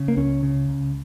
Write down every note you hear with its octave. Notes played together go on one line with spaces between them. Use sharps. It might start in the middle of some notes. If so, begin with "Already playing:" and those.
Already playing: C#3
A#3
C#2 C#4
C#3
C#2